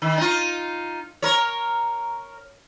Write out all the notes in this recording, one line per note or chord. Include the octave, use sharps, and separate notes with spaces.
D#3
D#4 F4
A#4 C#5